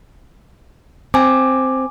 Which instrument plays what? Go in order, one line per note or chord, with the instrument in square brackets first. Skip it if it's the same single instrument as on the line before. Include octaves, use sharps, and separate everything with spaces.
[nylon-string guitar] C4 [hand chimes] G#5 D6